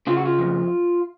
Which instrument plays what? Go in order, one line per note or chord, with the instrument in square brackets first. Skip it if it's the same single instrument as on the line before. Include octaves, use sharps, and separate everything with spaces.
[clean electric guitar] C#3 F4
F#4
F4
F2